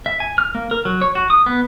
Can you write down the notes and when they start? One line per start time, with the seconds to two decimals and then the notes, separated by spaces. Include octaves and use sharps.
0.06 E5
0.20 G#5
0.38 F6
0.55 A#3
0.71 A#4
0.85 F#3
1.01 C#5
1.15 F#4
1.30 D#6
1.46 B3